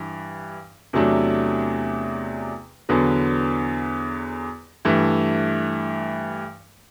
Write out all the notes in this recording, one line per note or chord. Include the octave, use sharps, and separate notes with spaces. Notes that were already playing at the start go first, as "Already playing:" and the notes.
Already playing: G2 E3
E2 C3 F#3 A3 D4
E2 D3 F#3 B3
G2 E3 A3